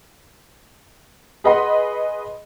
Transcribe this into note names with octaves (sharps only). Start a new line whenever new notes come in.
G#4 B4 D#5 F#5 B5 C6